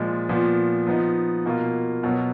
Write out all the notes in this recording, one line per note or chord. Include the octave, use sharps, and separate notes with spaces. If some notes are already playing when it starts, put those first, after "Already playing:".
Already playing: A#2 F3 G#3
A#2 F3 B3
F3 B3 D#4
B2 A#3 F4
B2 F#3 B3